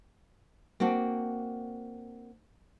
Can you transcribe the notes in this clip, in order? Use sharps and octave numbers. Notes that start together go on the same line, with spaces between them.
A#3 C4 D4 F#4